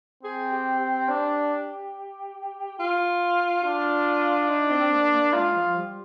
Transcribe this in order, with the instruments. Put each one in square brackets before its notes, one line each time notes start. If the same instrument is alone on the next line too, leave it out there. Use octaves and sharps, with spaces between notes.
[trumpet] C4 [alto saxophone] G#4
[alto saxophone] G4
G4
[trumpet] D4
[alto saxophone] F4
[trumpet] D4 [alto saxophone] F4
[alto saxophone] D#4
C4
A#3
A#3
[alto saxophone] G#3 [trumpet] F4
[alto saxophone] F3
G3